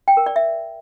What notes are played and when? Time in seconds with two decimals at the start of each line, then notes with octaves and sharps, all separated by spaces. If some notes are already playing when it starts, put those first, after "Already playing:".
0.08 G5
0.17 A#4
0.26 D5
0.36 E5